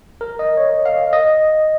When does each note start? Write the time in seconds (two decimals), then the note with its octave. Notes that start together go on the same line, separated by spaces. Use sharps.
0.21 A#4
0.39 D#5
0.57 C#5
0.86 F5
1.13 D#5